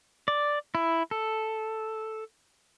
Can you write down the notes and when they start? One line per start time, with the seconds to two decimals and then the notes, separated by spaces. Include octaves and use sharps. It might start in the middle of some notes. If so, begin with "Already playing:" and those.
0.28 D5
0.75 E4
1.11 A4